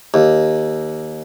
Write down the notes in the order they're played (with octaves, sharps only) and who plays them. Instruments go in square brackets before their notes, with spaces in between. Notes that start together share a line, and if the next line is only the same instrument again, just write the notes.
[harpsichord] D#2